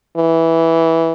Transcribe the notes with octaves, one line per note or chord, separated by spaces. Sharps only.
E3